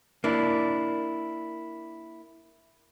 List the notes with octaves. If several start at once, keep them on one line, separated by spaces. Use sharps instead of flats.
A#3 D4 E4